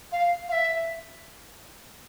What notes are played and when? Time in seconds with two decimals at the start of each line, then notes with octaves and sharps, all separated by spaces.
0.12 F5
0.48 F5
0.52 E5